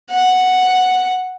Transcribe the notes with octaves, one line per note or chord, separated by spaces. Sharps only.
F#5